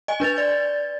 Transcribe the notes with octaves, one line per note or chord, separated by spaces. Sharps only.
D#5 G#5
D4 B4 A6 F7
D5 A6